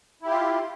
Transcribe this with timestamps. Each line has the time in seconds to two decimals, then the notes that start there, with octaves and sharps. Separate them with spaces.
0.22 E4
0.26 G4
0.31 F4